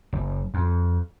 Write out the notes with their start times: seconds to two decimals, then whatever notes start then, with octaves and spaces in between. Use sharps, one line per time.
0.13 F#1
0.54 F2